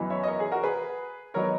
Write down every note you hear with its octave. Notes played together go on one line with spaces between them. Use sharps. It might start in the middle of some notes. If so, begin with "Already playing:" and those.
Already playing: F#2 E3 B3 D#4
C#5 E5
D#5
A#4 C#5
G#4
F#4 A#4
G#4 B4
F#3 B3 D#4 A#4 C#5